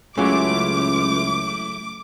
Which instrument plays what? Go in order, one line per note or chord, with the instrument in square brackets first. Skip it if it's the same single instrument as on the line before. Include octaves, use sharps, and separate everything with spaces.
[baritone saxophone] C#2 [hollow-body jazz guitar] C#3 F#3 [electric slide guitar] A3 E4 [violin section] D6